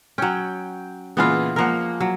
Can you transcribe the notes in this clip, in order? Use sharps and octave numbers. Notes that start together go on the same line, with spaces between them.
F#3 C#4 G5
A#2 C#3 E3 B3 F4
F3 G#3 A#3 A#4 F#5
F#3